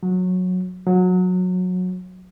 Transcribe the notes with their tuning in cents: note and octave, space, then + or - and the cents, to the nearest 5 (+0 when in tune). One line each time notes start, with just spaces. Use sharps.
F#3 -15
F#3 -20